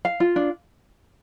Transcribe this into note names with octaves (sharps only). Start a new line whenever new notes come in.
F5
F4
D4